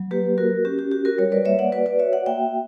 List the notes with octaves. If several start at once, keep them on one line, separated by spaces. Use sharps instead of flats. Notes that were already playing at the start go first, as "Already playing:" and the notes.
Already playing: F#3
A#3 G4 B4
F#4 A#4
C#4 G4
G4
F#4 G4
F#4 A#4
G3 A#4 C#5
B4 D5
A#3 C#5 E5
D5 F#5
F#4 B4 D5
B4 D5
F#4 C#5 E5
D5 F#5
A#3 E5 G5